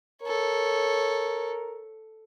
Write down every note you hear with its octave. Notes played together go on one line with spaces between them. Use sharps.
A4 A#4 C#5